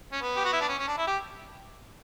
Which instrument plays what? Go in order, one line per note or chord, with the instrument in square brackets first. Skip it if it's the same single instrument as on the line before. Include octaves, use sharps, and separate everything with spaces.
[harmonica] C#4
B3
G4
F#4
E4
D4
C#4
C#4
D4
E4
G4